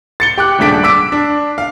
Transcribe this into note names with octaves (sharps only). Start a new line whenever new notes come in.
A6 C#7 G7
G4 D6 F#6
D#1 C#3 A3 D4 B6 D7
D6 E6 B6 D7
D4
F5